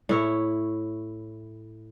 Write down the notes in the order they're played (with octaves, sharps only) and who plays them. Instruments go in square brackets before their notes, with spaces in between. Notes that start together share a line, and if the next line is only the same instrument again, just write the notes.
[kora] A2 E4 C#5